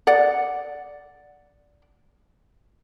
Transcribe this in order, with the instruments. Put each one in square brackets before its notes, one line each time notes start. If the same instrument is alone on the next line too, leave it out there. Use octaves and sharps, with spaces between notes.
[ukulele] D5 F#5